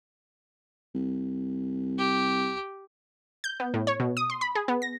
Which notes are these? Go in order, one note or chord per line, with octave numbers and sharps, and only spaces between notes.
C2
G4
G6
B3
A2
C#5
B2
D#6
C6
B5
G#4
B3
A#6